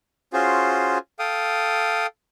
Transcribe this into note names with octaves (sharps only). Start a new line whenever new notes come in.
C#4 F4 F#4 G#4 C5
A4 F5 G5 D#6